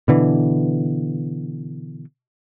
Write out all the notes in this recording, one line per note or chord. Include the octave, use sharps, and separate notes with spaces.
B2 D3 E3